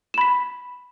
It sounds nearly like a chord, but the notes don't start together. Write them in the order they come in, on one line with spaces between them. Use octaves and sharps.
E7 B5 B6